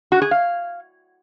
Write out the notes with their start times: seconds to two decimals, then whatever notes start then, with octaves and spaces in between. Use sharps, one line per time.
0.12 F#4
0.22 G#4
0.31 F5